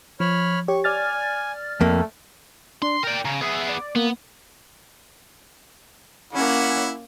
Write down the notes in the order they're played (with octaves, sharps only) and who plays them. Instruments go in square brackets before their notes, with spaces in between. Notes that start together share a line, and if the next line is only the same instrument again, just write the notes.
[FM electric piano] F3 [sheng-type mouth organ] C#5 B5 F6
[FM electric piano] G4 C#5 [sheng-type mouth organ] C#6
[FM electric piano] D5 F6 A6 [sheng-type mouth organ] G#5
[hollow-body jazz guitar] F2 A#3 [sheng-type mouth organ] A3
[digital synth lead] D4 [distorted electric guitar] C6
[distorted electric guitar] A#4 D5 [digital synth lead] G5
[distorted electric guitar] C#3 [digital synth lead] A#5
[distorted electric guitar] B3 G#4 [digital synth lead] E5
[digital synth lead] D5
[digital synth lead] A#3 [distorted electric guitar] B3
[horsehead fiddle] A#3 C#4 [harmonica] E4 F#5 B5